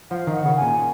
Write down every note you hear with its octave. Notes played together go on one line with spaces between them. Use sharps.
F3 F5 F#5
D#3
F#5
C#3
G#5
A#2